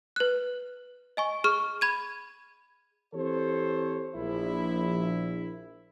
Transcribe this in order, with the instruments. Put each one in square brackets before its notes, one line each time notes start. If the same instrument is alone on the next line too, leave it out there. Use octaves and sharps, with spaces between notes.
[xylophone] B4 F#6
D#5 G#5 C#6
G#4 C#6 F6 G7
B5 G#6 D#7
[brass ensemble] E3 C4 G4 A4 C5 C#5
A#1 E4